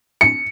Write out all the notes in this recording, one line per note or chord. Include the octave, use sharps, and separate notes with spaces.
C#7